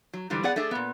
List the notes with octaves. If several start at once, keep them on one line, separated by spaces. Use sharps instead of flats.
F#3
G#2 D3 E3 G3
B3 G#4 D5 F#5
A3 D4 G#4 E5
A#2 B3